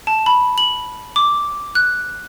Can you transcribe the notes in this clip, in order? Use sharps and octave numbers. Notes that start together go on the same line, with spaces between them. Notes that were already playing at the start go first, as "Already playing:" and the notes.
A5
B5
F#7
D6
F#6